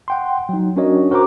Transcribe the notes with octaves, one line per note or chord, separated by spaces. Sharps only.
F#5 G5 C6
F#3 D#4
C#4 D4 F#4 A#4 C#5 D#5
F#4 A#4 C5 F#5 A#5 D6